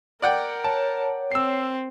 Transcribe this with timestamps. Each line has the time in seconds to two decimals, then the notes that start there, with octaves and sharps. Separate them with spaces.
0.22 A#4 D5 F#5 G5
0.64 C#5 A5
1.32 C4 E6 C7